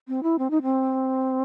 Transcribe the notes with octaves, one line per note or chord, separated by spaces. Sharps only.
C4
E4
C4
D#4
C4